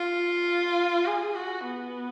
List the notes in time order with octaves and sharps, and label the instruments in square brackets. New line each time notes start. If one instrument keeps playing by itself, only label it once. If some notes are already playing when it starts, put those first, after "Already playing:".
Already playing: [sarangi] F4
G#4
F#4
B3